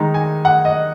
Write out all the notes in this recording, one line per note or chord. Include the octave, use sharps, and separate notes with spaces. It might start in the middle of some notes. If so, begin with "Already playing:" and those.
Already playing: D#3 G#3 D#4 A#5
G#5
F#5
D#5